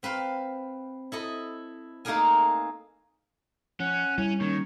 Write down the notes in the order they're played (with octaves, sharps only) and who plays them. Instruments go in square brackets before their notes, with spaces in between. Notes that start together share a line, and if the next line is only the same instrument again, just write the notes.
[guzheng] C4 B4 F5 C6
E4 A4 D#5
A3 A#3 D#4 G#4 A#4 G#5
[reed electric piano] F3 [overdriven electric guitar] C#4 [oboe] F#5
[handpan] G3 [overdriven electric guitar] C#4 [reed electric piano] E4
[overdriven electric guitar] D#3 [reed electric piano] A#3 C#4 [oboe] C#5